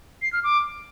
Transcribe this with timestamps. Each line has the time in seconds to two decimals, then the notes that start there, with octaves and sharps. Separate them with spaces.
0.22 C7
0.33 F6
0.44 D6